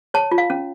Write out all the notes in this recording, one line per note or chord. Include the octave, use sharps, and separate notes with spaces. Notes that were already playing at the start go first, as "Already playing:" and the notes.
C#5 A5
F4
F5
C#4